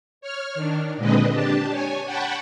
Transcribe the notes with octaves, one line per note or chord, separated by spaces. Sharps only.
C#5 F6
D#3 D4
A#2 D3 G#3 C4 B4 D#5
D4 G4 A5
C#5 G#5
F#5 G5 A5 B5 C#6